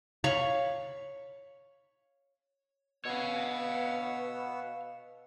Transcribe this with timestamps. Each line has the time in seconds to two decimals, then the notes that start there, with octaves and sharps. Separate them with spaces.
0.24 C#5 F5 B5 C#6
3.05 B2 B3 C#5 F5 E6